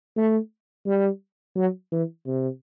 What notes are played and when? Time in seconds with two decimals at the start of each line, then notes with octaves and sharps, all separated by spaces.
0.17 A3
0.86 G3
1.57 F#3
1.92 E3
2.27 C3